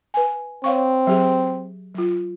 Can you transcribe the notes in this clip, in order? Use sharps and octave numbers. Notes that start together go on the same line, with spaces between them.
B4 G#5
C4 C#5 F5 C#6
F#3 G4 G#4
F#3 F4